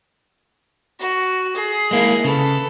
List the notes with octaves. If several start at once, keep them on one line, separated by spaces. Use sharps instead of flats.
F#4
G#4
G#3 A#3 E4
C#3 A4 B4